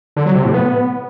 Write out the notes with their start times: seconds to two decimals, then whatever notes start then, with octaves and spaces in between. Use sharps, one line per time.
0.17 D3
0.26 F#3
0.35 C3
0.45 A2
0.54 B3